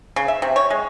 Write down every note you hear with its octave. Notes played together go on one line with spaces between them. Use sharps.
C#3
E5
C3
C#5
G#3